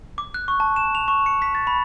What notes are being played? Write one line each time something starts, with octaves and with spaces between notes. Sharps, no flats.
D6
F#6
C#6
A5
E7
F7
C#6
C#7
B6
A6
B5